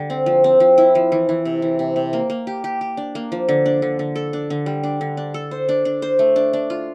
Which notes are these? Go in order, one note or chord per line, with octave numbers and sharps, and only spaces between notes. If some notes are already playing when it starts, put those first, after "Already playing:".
Already playing: D3 G3 D4
C4
F3
C4
F3
E4
F3
E3
E3
C3
E3
C3
C3
A#3
A#3
G4
G4
G4
D4
A#3
F3
D3
D4
D3
D3
A4
D4
D3
G3
D4
D3
D4
A4
C5
D4
D4
C5
A3
D4
D4
F4